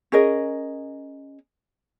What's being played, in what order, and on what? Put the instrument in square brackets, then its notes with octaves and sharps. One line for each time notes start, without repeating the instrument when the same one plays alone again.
[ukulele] C#4 G#4 A#4 D#5